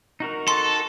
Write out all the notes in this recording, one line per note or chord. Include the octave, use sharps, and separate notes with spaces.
D#4 F#4 A#4
A4 C6